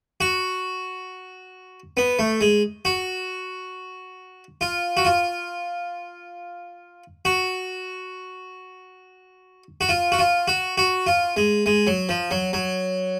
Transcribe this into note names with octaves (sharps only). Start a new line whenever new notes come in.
F#4
B3
A3
G#3
F#4
F4
F#4
F4
F#4
F#4
F4
F#4
F4
F#4
F#4
F4
G#3
G#3
F#3
F3
F#3
F#3